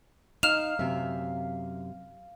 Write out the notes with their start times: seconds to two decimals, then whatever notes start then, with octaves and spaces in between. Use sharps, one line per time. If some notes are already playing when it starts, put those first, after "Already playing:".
0.43 D#4 F5 F6 E7 F7
0.79 F#2 C3 E5